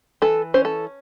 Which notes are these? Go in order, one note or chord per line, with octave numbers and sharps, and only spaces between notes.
E3 A4
C#4 C5
A4